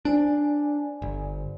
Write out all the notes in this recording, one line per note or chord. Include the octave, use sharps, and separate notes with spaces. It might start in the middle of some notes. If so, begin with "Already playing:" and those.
D4 C5 D5 G#5
G1